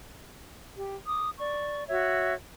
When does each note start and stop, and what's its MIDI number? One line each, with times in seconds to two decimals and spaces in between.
0.76 0.96 67
1.07 1.29 86
1.07 1.29 87
1.38 1.85 74
1.38 1.85 85
1.88 2.34 66
1.88 2.34 73
1.88 2.34 76